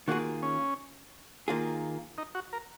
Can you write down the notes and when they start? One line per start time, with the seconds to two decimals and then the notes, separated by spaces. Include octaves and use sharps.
0.08 D#3 A#3 F4 F#4 G#4
0.43 C#4
1.48 D#3 A#3 F4 G#4
2.18 D#4
2.35 F#4
2.53 A#4